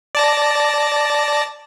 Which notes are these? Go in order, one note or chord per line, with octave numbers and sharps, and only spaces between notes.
D5 A5 A#6